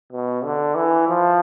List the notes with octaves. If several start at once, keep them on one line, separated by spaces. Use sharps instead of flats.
B2
D3
E3
F3